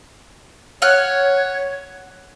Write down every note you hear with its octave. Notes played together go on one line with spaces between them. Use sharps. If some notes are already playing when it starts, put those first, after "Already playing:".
C#5 F#5 F6